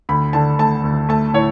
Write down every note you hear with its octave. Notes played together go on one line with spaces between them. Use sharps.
D2 B5
D3 A5
A3 A5
D2
A3 A5
A2 C#5